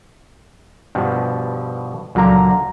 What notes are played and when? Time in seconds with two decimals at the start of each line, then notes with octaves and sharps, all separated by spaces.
0.95 G2 B2 F3
2.15 C#2 A#2 D3 F#3 A#3 A#5